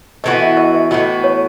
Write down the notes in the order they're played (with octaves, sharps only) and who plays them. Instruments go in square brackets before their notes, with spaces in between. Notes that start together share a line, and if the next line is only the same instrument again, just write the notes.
[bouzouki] A2 E3 B3 F#4 [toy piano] D#5
[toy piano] E5
D#5
E5
[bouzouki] A2 E3 B3 F#4 [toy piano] D#5
[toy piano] C#5